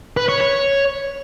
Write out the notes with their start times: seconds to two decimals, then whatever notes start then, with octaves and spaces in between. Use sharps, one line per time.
0.17 B4
0.29 C#5
0.40 C#5